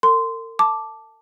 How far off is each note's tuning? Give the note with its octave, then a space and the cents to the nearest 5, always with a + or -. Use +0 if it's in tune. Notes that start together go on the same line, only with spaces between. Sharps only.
A#4 -45 C6 -15
A5 +0 D6 +0